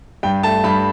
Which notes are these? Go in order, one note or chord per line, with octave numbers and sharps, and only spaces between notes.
G2 G5
A3 A5
G2 B5